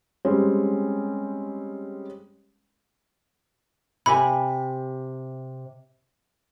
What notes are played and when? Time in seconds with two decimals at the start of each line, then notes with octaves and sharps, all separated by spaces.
0.25 G3 G#3 C4 C#4
4.06 C3 G4 G#5 B5